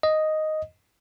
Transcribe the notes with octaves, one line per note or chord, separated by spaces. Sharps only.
D#5